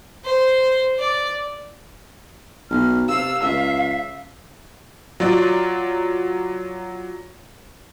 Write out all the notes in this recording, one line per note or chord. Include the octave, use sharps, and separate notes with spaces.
C5
D5
B1 F6
C3 F5 E6
C#2 E5
F#3 F4 D5